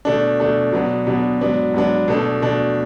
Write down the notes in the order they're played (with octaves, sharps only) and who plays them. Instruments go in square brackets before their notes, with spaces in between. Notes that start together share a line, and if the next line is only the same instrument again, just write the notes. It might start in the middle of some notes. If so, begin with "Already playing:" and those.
[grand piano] B2 A3 D4
B2 A3 D4
B2 F#3 B3 D4
B2 F#3 B3 D4
G#2 F#3 B3 D4
G#2 F#3 B3 D4
B2 A3 D4
B2 A3 D4